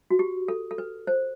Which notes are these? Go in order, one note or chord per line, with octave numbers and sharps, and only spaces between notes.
F#4
G4
A4
A4
B4
C5